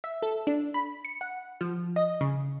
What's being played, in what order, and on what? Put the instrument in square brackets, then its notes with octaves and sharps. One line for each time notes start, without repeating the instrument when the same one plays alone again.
[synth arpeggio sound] E5
A4
D4
B5
C#7
F#5
F3
D#5
C#3